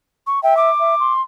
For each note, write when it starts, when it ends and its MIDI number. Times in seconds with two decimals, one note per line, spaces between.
0.27 0.42 85
0.43 0.70 76
0.43 0.57 79
0.57 1.13 86
0.80 0.95 76
1.00 1.21 84